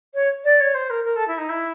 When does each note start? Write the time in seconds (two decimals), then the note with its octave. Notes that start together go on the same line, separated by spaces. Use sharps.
0.14 C#5
0.44 D5
0.60 C#5
0.74 C5
0.90 A#4
1.04 A#4
1.16 A4
1.27 E4
1.37 D#4
1.49 E4